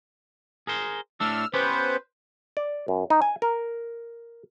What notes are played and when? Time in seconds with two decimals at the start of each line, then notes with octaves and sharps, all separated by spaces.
0.67 G#4 A#4 C5
1.20 A2 A3 D4 E6 F6
1.54 B3 C#4 G4 B4 C5
2.57 D5
2.88 F#2
3.10 D#4
3.22 G#5
3.42 A#4